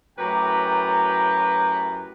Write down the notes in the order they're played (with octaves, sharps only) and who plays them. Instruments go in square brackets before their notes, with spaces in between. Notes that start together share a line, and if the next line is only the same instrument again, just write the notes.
[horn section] F#2 A2 G4 B4 G5 A#5